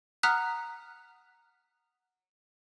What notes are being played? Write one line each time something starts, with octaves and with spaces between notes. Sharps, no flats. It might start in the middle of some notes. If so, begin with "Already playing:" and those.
F#5 A#5 D#6 F6 F#6 B6